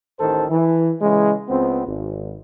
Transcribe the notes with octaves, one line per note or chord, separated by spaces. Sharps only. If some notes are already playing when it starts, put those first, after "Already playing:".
A1 D#3 A4 C5
E3
C#3 E3 G#3
C#2 B3 C4
G#1